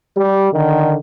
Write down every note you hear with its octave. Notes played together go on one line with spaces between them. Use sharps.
G3
D3 D#3